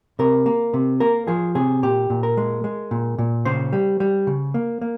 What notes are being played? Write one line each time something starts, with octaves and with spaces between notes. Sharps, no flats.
C3 A#4
A#3
C3
A#3 A#4
F3 G#4
C3 G#4
A#2 G4
A#2
A#4
G#3
G#3
A#2
A#2
C#3 C5
G3
G3
C#3
A#3
A#3